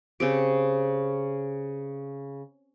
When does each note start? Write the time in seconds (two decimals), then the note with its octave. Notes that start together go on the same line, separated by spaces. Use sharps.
0.20 C#3 C4 G4